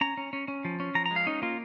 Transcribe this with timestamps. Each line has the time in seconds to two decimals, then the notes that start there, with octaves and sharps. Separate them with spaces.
0.01 C#4 A#5
0.17 C#4
0.33 C#4
0.48 C#4
0.65 F3
0.80 C#4
0.95 F3 A#5
1.06 A#5
1.11 G#3
1.16 F5
1.27 C#4 D#4
1.42 A#3 F4